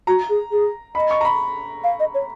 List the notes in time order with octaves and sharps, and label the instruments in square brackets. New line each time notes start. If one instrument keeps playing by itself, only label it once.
[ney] F#4 [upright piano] A#5
[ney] G#4
G#4
[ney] D#5 [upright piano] B5
[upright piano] C#6
A#5
B5
[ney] F5
D#5
C#5